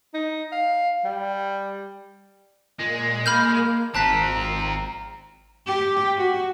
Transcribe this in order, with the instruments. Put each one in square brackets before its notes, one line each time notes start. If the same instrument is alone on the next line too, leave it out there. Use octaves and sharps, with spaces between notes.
[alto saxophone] D#4
F5
G3
[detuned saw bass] A#2 [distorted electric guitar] G#3
[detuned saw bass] A#3 [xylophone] B5 F6 G6
[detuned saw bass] G#1 [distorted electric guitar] C4 F4 [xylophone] A5 F#6 B6 [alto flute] A#5
[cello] G4
F#4